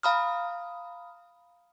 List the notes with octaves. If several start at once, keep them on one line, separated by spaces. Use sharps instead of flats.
F5 A#5 B5 D#6 F6